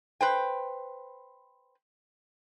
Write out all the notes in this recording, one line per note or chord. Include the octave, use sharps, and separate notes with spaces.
B4 C5 G5